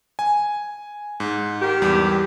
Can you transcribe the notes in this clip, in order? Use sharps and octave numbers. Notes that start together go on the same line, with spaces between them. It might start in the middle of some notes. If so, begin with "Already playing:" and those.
G#5
G#2
D#3 G4
E2 G3